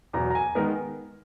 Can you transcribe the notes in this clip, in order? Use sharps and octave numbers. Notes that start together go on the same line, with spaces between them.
E2 B2 F#3 A#5
A#5
G#5
D#3 G#3 B3 A#4